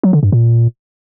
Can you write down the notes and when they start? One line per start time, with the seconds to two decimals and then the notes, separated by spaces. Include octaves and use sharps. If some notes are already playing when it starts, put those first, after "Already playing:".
0.03 F#3
0.13 D3
0.23 G2
0.32 A#2